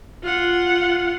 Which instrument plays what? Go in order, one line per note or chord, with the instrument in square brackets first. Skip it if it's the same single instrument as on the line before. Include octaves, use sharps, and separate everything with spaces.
[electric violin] F4 F#5